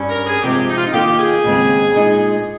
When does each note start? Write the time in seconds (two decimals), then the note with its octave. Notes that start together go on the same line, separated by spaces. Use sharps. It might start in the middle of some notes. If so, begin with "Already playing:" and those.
Already playing: G2 G3 C#4
0.10 A#4
0.26 G#4
0.42 C3 F3 G#3 C4 G4
0.69 D#4
0.77 F4
0.85 D#4
0.93 D#3 A#3 F4 G4
1.18 G#4
1.44 D#2 C#3 G#3 C4
1.95 A#2 G#3 D#4